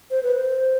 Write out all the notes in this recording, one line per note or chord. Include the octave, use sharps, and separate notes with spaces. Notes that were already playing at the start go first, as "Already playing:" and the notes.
C5
B4
C5